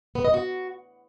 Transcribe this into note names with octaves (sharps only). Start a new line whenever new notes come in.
B3
D#5
F#4